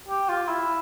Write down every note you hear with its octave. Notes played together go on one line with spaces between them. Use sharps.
G4
F4
E4